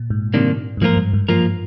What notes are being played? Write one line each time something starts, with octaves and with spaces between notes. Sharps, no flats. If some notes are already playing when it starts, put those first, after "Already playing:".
Already playing: A#2
G#2
C3 D#3 G3 A#3 D4
G2
G#2 F3 A#3 F4 A#4
G2
G#2
F3 A#3 F4 A#4